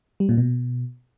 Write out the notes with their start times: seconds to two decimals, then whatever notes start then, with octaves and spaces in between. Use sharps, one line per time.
0.20 G3
0.29 A#2
0.38 B2